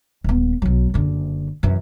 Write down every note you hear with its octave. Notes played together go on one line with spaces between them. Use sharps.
D#1 B3
B1 F#3
F#1 D3
F#2 E3